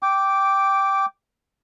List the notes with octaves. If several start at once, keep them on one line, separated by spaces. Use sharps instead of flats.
G5 D6